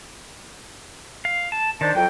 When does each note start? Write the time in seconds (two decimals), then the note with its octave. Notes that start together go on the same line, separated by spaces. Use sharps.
1.25 F5
1.52 A5
1.81 D#3 D4 C5 A5
1.95 F2 F#3 G5